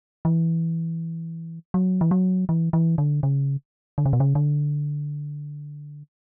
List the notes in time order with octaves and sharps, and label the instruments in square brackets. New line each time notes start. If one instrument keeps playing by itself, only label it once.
[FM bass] E3
F#3
E3
F#3
E3
E3
D3
C#3
D3
C#3
B2
C#3
D3